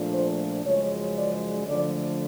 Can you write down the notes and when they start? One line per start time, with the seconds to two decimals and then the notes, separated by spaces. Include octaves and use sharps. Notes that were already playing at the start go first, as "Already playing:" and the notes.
Already playing: A#2 F3 A3 D4
0.12 C5
0.64 F#2 C#3 F3 G#3 C#5
1.15 D5
1.67 D3 F3 A3 D5